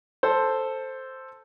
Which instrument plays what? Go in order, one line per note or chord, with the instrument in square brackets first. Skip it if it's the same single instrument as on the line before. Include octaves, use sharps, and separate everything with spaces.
[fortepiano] A4 C5